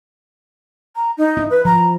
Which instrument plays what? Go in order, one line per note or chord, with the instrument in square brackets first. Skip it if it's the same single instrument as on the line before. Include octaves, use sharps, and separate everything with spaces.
[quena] A#5
D#4
[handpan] E4
[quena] B4
[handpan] F3 [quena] A#5